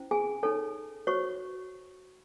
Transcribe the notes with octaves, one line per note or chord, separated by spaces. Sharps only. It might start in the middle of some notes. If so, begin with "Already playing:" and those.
Already playing: C#4 E4 C5
G#4 G#5
D#4 G#4 A4 C#5 A5
F#4 C5 C#5 C#6